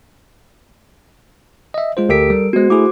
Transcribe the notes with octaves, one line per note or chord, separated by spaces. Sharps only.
D#5 E5
G#3 F4 C5
D2 G4 A4 A#4 B6 D7
G3
G#3 B3 F#4 C5
A3 E4 G#4 D6